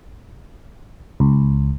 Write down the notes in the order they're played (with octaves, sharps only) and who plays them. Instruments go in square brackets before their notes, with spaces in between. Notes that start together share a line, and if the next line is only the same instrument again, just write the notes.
[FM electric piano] C#2